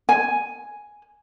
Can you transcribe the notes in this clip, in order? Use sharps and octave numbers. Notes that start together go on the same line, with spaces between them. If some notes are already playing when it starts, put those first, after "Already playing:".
G#5